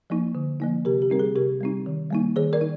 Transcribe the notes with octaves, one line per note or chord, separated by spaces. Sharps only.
F3 A#3 D#4
D3
F3 A#3 D#4
C3 G4 A#4
G4
G3 C4 D#4 A#4
G#4
C3 G4 A#4
G3 C4 D#4
D#3
G3 A#3 D#4
D#3 G#4 C5
A#4 D5
D#4